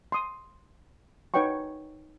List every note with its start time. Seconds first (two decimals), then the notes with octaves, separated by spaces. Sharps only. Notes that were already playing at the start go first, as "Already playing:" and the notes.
0.12 C6 D#6
1.34 D#4 B4 C#5 F#5 G5 C#6